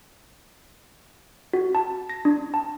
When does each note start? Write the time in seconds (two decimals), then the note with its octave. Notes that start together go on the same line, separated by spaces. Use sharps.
1.53 F#4
1.75 A5
2.10 A#6
2.25 D4
2.54 A5